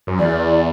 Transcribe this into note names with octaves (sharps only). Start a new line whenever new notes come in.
F#2
E2 D5